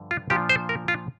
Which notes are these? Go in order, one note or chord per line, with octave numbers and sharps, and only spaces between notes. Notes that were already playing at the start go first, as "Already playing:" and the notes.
Already playing: G2 D3 F3
F4
A#2 F3 D4 F4 G4
C5
A#4
F4